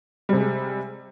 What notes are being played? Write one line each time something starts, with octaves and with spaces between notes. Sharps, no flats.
C3 G3 G#3